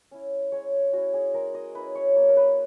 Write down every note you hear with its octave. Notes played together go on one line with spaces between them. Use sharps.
C#4 E4
G#3 C#5
C#4 E4 F#4
G#4
G#3 A#4
D#5
C#4 E4 B4
C#5
A#3 C#5
A#4
B4